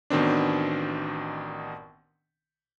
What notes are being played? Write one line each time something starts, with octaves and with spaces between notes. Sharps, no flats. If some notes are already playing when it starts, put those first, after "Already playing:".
A1 B2 D#3 C4 D4